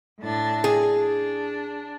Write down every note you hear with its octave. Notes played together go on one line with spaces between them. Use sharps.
A2 D4 A6
G#4
D4